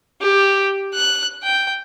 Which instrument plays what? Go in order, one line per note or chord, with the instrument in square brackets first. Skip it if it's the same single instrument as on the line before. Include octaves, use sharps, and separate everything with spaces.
[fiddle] G4
F#6
G5